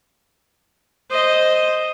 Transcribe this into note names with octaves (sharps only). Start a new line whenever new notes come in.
C5 D#5